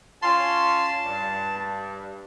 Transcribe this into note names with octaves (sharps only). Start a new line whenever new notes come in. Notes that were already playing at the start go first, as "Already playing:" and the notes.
C#4 F4 A5 C6
G2